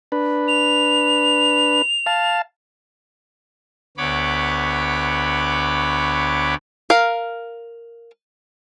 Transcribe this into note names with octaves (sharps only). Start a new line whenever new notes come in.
D4 B4
F7
F5 A5
D2 B3 C#5 B5 D6
A#4 F5